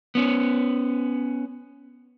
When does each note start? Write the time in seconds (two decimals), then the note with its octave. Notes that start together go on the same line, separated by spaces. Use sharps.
0.15 B3 C#4